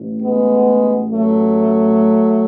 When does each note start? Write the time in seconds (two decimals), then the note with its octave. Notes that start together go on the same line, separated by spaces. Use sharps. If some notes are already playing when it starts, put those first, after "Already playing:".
Already playing: A1 A2
0.21 G#3 B3
1.10 F#3 A3